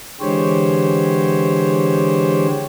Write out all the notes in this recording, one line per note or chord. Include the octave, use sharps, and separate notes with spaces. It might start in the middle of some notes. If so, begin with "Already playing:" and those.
D3 E3 G#3 G4 C5 C#5